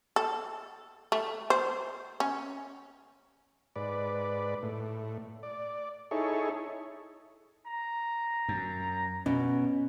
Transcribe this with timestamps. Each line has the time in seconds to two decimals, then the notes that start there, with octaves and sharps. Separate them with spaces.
0.16 A4
1.12 A3
1.50 C5
2.20 C#4
3.76 G#2 B4 D5
4.62 A2
5.43 D5
6.11 D#4 E4 G#4 A4 C#5
7.66 A#5
8.48 F#2
9.26 B2 C#4